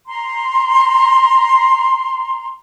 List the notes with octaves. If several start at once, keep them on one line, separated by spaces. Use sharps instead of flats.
A#5 C6